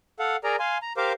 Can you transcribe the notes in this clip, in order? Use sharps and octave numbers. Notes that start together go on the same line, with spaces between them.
A4 F5 F#5
G#4 A#4 D5 A#5
F5 G#5 C6
A#5
G4 A#4 C5 F5 D6